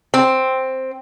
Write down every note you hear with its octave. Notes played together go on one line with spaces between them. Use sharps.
C4